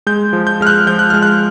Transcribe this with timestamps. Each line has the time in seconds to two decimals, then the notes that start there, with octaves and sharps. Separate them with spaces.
0.07 G#3 G6
0.33 F3
0.47 G6
0.61 G#3 F6
0.67 F#6
0.87 F3 G6
0.99 F#6
1.10 G#3 F6
1.23 F#6